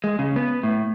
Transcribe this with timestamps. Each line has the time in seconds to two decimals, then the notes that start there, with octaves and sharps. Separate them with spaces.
0.04 G#3
0.19 C#3
0.36 B3
0.63 A2